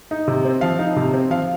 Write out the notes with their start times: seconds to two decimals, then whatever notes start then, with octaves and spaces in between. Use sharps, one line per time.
0.11 D#4
0.28 C3
0.45 C4
0.61 F3 F5
0.79 D#4
0.96 C3
1.14 C4
1.30 F3 F5